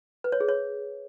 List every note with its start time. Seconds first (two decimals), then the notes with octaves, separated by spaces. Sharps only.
0.24 B4
0.32 C#5
0.40 G#4
0.49 C#5